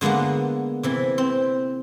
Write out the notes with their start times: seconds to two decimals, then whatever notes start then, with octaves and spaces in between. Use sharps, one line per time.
0.01 D3 G#3 A#3 B3 F#5
0.83 C3 E3 E4
1.18 C4